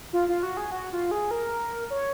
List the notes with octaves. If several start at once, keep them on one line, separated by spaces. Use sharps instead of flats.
F4
F4
F#4
G#4
F#4
F4
G#4
A#4
C#5